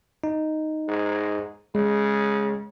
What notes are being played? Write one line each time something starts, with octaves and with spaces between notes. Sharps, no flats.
D#4
G#2
C#3 G#3